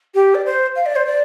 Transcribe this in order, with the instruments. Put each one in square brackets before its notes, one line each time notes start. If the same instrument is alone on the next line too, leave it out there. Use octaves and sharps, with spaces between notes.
[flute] G4
D5
C5
F5
D5
C5
D5